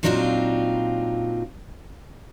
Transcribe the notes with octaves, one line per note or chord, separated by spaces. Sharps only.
A#2 F#3 C4 D4 D#4 F4